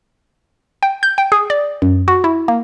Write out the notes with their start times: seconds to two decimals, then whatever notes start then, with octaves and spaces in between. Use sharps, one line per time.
0.83 G5
1.03 G6
1.18 G5
1.32 G#4
1.50 D5
1.82 F#2
2.08 F#4
2.24 E4
2.48 A#3